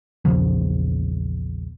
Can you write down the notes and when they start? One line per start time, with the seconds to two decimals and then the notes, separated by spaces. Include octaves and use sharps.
0.25 A#1 E2 C#3 F3